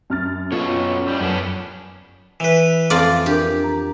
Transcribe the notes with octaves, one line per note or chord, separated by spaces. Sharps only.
F#2 F6 A6
B2 C#4 F4 A4 C#5
A2 G3
F#2 B3 C#4 D4
E3 B4
F2 F4 D5
D4 G4 A#4
A#5